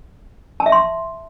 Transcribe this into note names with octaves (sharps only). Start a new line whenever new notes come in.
A5
E5
C6